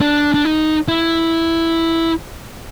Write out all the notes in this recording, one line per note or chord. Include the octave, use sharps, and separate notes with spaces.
D4
D4
D#4
E4